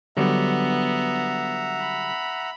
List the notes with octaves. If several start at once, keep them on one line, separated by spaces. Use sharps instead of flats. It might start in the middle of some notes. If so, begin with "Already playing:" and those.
D3 F#3 G3 B3 E5 F#5 A#5
B5